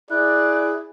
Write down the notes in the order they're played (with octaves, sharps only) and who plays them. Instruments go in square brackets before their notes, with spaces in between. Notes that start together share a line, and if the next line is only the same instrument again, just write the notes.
[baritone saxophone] E4 [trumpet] G#4 [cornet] D5 [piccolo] F#6